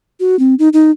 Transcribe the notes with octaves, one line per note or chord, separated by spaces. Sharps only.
F#4
C4
D#4
D#4